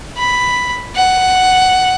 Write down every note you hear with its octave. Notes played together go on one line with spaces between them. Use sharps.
B5
F#5